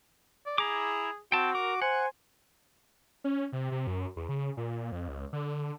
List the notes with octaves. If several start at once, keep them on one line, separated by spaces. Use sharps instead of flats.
D5
E4 G#4 A#5 D6
C4 F#4 G5 A5
A#4 D6
C5 F#5 G#5
C#4
C3
C3
F#2
E2
C#3
A#2
F2
C#2
D3